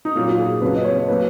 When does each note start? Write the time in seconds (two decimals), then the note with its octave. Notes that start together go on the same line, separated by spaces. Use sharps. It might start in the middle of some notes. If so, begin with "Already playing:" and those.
0.05 D#4
0.16 A#2 F#3 A#3 F4
0.28 F#4
0.39 G#4
0.61 F2 C#3 F#3 A#3 B4
0.75 D#5
0.85 C#5
1.08 F#3 A#3 B4